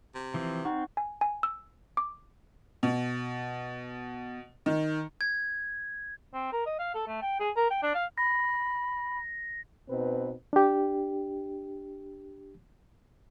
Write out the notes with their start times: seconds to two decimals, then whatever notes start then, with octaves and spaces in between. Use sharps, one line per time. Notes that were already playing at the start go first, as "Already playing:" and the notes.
0.15 C3
0.34 E3 F3 C4
0.65 C4 D#4 F#5 C#6
0.97 G#5
1.21 G#5
1.43 E6
1.97 D6
2.83 B2
4.66 D#3
5.21 G#6
6.34 C4
6.52 A#4
6.66 D#5
6.79 F5
6.95 A4
7.07 A3
7.22 G5
7.40 G#4
7.56 A#4
7.70 G5
7.82 D4
7.95 F5
8.18 B5 A#6
9.89 B2 C4 D#4 B4
10.53 D4 G4